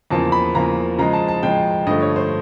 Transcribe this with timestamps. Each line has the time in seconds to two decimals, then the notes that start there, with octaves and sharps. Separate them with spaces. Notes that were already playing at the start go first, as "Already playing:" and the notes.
0.11 E2 C#3 F3 A#3 A5
0.32 B5
0.55 E2 C#3 F3 A#3 A#5
0.98 C#3 F3 G#3 A#5
1.13 A5
1.28 A5
1.43 C#3 F3 G#3 G5
1.87 G2 D3 F3 A3 D#5
2.02 C#5
2.16 C5